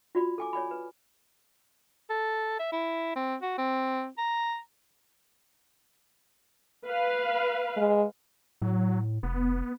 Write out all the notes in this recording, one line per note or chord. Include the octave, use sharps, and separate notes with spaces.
F4 F#4 D5 B5
A4 G#5 D6
C#5 D5 G#5 B5
B4
A4
E5
E4
C4
F#4
C4
A#5
B4 F5
G#3
A2 F#3
F1 B3